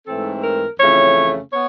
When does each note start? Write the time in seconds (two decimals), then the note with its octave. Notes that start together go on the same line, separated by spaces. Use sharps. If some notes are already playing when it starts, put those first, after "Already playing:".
0.07 G#2 E3 A3 C4 A4
0.43 A#4
0.80 F2 C#3 E3 A3 C#5
1.53 B3 C#5